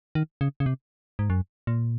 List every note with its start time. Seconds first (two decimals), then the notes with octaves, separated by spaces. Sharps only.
0.15 D#3
0.41 C#3
0.60 C#3
0.66 C3
1.19 G#2
1.30 F#2
1.67 A#2